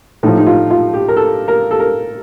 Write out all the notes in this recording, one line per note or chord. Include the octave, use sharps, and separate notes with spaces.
A2 F3 D#4
D#4
F4
F4
G4
A#4
A4
A#4
A4
A#4